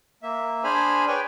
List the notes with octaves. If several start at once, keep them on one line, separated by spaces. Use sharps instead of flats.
A#3 E5
D4 G#4 C5 G#5 B5 F6
B4 C#5 D5 G5 G#5